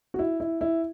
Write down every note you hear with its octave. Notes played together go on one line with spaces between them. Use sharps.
F#4
E4
E4
E4